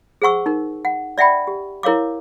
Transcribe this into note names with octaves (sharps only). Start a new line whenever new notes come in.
G#4 C5 F#5 C#6 E6
D#4 A#4
F#5
D5 E5 F#5 G5 B5
G4
E4 A#4 C#5 F5 D6